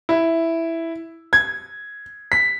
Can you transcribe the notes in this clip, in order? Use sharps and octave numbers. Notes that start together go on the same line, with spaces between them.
E4
G#6
B6